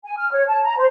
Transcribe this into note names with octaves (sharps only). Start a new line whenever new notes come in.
G#5
F6
C#5
A5
A#5
C5